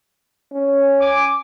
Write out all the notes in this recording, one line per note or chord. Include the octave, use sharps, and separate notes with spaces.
C#4
G#5 D6